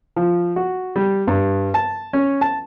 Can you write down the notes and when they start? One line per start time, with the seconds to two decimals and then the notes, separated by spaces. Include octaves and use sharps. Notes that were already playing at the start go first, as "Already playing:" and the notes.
0.16 F3
0.56 F#4
0.96 G3
1.27 G2
1.74 A5
2.13 C#4
2.41 A5